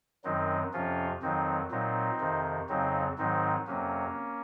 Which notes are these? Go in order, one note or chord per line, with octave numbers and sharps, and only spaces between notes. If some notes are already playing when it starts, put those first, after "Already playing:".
F#2 D#3 F#3 C4 D#4
F2 C3 F3 C#4 F4
F2 D#3 F#3 C4 D#4
A#2 F#3 C4 D#4
F2 C3 D#3
F2 C#3 F#3 C4 D#4
G#2 D#3 F#3 C4 D#4
F2 C3 F#3 A#3 C#4